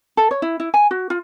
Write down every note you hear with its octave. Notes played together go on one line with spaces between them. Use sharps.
A4
C#5
E4
E4
G#5
F#4
F4